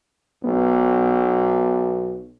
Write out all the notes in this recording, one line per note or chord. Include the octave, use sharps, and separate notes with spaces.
B1 B3